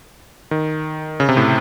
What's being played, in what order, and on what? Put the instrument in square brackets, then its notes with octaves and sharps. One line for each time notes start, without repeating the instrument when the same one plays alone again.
[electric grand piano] D#3
C#3
C3
A2